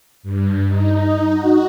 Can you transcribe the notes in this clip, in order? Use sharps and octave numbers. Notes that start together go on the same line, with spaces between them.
G2
D#4
F#4